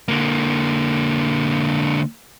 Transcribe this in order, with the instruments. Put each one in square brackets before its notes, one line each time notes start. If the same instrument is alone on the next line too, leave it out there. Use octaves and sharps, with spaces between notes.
[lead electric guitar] D3 A#3